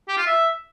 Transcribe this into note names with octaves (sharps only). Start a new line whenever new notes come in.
G4
F4
E5